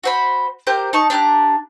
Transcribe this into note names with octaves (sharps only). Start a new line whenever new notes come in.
F#4 C5 B5
G4 A#4 C5 G6
D#4 A5 C#6
D4 G4 A#5 F#6